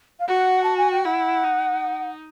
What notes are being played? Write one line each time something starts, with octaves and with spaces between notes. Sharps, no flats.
F5
F#4 F#5
A5
G#5
G5
E4 F#5
D#4